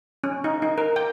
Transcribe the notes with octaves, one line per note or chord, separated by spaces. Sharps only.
C#4
D#4
D#4
A#4
G5